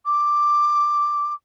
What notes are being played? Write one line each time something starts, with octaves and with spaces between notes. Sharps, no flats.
D6